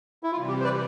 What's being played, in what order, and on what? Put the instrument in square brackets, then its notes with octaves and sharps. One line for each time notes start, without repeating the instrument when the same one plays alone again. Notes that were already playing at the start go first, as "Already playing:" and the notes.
[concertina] E4
[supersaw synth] C3 E3 G3 [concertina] F4
[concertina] G4
C5
B4 D5